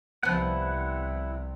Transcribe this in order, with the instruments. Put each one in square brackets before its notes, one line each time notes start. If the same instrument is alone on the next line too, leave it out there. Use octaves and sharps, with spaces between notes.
[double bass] C2 C3 [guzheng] F3 B3 [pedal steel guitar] E4 F#5